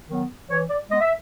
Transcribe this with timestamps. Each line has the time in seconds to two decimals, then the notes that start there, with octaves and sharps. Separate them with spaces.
0.09 D#3 F#3 B3
0.50 E3 C#5
0.69 D5
0.90 G#3 D#5
0.93 B3
1.00 E5